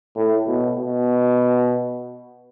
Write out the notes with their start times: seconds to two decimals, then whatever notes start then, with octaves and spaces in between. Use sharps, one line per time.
0.15 A2
0.47 B2
0.76 B2